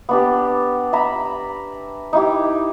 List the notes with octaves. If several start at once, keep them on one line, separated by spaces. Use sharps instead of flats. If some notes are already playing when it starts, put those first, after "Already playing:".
B3 D4 G4
E5 A#5 B5
D#4 E4 G4